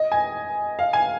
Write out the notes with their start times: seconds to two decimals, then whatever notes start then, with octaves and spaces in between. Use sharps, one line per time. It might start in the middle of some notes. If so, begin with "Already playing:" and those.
Already playing: D#5
0.12 G#5
0.79 F5
0.93 G#5